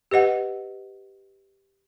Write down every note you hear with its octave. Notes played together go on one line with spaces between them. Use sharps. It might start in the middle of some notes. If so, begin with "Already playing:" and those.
G4 B4 D#5 F#5